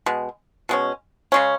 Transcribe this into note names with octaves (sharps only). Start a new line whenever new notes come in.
B2 G#3
B2 G#3 C#4
C#3 G#3 C#4